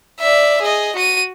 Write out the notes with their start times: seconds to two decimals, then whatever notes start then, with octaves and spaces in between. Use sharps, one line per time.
0.20 D5 E5
0.61 G#4 D#5
0.95 F#4 D#7